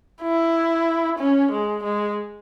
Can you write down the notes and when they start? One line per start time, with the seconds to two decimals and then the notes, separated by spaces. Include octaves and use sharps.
0.23 E4
1.19 C#4
1.52 G#3
1.84 G#3